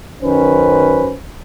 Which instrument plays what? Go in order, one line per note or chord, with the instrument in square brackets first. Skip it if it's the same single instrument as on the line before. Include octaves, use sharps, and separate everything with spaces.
[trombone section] F#2 D#3 C#4 B4 C5